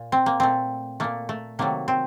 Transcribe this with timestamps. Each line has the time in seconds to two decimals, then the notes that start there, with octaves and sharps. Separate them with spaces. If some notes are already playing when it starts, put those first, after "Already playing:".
Already playing: A#2
0.12 C4
0.26 A#3
0.40 A#2 A3 C4
1.00 A#2 A3 A#3
1.29 A3
1.59 C3 D#3 F#3 A3 A#3
1.88 C4